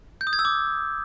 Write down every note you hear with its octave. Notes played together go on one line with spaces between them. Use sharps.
G6
D#6
G#6
E6
D6